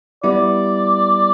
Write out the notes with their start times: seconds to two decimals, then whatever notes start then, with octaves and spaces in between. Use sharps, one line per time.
0.24 G3 B3 E4 D5